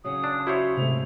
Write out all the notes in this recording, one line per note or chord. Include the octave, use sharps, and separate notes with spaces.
C#3 F#3 D#6
D4
E4 F#4 C5 C#5
G#2 C3 A3 F7